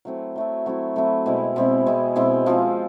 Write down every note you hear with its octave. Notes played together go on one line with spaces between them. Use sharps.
F#3 A3 C4 E4
F#3 A3 C4 E4
F#3 A3 C4 E4
F#3 A3 C4 E4
B2 G#3 C4 E4
B2 G#3 C4 E4
B2 G#3 C4 E4
B2 G#3 C4 E4
F3 G#3 C4 F4